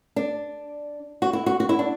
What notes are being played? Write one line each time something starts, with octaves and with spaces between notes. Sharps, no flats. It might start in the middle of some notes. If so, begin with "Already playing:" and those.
D4
F#4
E4
F#4
F#4
E4
D4